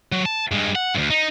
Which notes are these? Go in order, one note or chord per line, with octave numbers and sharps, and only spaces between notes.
F#3
A5
G2 G#3
F#5
D2 G2
D#4